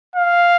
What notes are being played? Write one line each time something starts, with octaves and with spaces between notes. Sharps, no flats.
F5